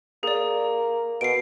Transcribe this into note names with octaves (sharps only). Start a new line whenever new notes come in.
A#3 G#4 D5
B2 C7 D7